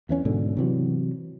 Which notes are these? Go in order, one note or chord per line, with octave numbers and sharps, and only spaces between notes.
E2 E3 C#4
G#2 B2 D3
C3 E3 F#3